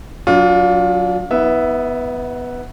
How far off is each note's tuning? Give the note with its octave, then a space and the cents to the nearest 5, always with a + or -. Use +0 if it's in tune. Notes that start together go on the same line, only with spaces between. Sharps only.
F#3 +0 D4 -35 F4 +25
B3 +0 E4 -45 E5 +0